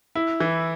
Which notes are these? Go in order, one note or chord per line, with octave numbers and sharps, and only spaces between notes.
E4
E3